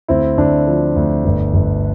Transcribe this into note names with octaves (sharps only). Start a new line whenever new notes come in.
D2 C4 E4
D2 D4
F3
D2
G1
G1